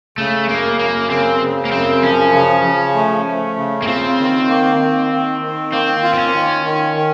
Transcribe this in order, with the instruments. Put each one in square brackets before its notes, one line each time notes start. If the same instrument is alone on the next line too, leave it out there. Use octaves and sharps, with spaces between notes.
[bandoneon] C#3 [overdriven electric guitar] A3
[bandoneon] F#2 [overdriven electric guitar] A#3
[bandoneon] F#2 [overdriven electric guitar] A#3
[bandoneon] C#3 [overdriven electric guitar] C4
[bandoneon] C#3
[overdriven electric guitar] A#3
[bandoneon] F#2 [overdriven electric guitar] C4
[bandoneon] F3 [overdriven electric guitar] C#4
[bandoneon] C#3
F3
A3
A3
C#3
[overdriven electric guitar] A#3
[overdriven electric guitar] C4 [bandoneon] F4
[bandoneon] D#3
A#3
D#3
D#3
D#3
[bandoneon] A#3 [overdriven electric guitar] C4
[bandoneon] F4
[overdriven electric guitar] C4
C#4
[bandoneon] D#3
D#3
D#3